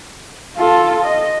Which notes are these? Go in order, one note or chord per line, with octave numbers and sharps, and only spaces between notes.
F4 A4
D#5